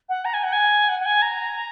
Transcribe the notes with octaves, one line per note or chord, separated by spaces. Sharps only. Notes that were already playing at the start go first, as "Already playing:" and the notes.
F#5
A#5
G#5
F#5
G#5
F#5
F#5
G#5
A#5